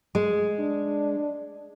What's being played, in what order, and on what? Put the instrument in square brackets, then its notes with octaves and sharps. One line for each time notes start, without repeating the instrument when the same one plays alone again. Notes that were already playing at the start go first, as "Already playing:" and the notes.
[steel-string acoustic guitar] G#3
[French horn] D4